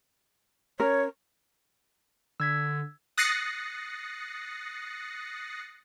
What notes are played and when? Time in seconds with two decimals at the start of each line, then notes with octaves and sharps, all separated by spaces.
0.80 C#4 A#4 C#5
2.40 D3 E6 G#6 B6
3.18 D#6 F#6 A6 A#6 C7 C#7